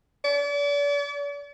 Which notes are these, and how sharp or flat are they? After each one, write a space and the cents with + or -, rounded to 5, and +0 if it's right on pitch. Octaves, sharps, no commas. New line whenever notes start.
D5 -40